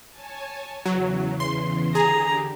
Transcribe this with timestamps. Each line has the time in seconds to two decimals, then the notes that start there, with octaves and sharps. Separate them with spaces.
0.10 C#5 G#5 A5
0.86 E2 C#3 E3 F#3
1.40 C6
1.95 D3 G4 G#4 A#5